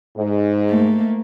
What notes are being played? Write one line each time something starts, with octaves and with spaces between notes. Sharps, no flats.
G#2
A3 A#3